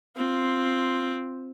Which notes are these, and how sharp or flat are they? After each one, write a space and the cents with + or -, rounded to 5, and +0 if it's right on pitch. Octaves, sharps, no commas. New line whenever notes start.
C4 +5 F4 +0